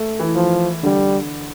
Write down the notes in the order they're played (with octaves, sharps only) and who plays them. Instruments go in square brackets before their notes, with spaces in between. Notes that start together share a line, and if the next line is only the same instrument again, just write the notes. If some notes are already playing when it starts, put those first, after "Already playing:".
Already playing: [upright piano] A3
E3
[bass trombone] F3
[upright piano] D3 [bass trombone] G3